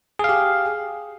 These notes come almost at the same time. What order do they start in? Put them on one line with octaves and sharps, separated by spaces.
G#4 F5 G4